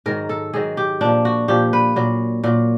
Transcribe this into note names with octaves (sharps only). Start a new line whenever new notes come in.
G#2 D#3 F#3 A#4
A4
G#2 D#3 F#3 G#4
G4
A#2 F3 D4
F#4
A#2 F3 G4
B4
A#2 F#3
A#2 F#3